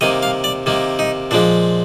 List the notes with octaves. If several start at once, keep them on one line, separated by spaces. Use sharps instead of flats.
C3 D#3 A#3 D#5
F5
D5
C3 D#3 A#3
D#4
A#2 F3 G#3 D4